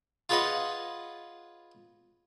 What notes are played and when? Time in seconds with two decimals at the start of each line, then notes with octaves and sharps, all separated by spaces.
0.29 F4 G#4 B4 C#5 D#5 F#5